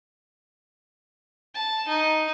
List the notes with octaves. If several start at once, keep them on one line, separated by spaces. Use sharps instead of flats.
A5
D#4